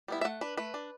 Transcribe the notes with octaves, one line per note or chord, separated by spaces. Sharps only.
G3 B3 E4
E5
A3 F#5
D4 B4
A3 B4
D4